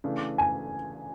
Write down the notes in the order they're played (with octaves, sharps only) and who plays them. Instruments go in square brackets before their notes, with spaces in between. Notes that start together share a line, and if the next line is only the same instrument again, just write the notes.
[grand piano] C#3 E3 A3 D4
[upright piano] G#5